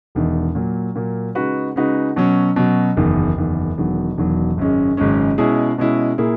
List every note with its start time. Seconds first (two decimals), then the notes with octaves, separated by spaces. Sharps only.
0.15 E1 E2 D#3
0.55 A#2 F#3 A#3
0.95 A#2 F#3 A#3
1.35 C#3 G#3 D#4 F#4 B4
1.76 C#3 G#3 D#4 F#4 B4
2.16 B2 F#3 C#4
2.56 B2 F#3 C#4
2.97 F#1 E2 D#3
3.37 F#1 E2 D#3
3.77 E1 E2 D#3 F#3
4.17 E1 E2 D#3 F#3
4.57 G#1 F#2 C#3 G#3 C#4
4.97 G#1 F#2 C#3 G#3 C#4
5.38 B2 G#3 C#4 E4 G#4
5.78 B2 G#3 C#4 E4 G#4
6.18 A#2 A#3 E4 G#4